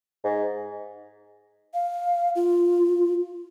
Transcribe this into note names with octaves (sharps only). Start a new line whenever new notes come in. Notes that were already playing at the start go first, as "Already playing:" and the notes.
G#2
F5
F4